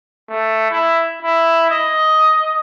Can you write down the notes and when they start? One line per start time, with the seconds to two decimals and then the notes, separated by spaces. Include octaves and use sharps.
0.30 A3
0.71 E4
1.23 E4
1.70 D#5